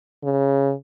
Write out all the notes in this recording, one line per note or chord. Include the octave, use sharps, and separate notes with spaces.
C#3